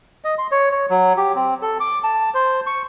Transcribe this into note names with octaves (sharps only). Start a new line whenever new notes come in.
D#5
C6
C#5
C#5
F#3
G4
C4
A4
D6
A5
C5
C#6